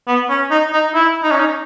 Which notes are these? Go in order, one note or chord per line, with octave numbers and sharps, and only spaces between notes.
B3
C#4
D#4
D#4
E4
D#4
C#4
D#4